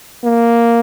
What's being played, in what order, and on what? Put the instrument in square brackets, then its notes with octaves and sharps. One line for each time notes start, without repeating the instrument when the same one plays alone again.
[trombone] A#3